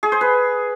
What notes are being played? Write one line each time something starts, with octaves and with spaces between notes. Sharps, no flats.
G#4
C5
B4